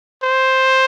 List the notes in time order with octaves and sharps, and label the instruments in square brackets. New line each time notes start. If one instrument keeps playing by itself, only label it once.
[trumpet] C5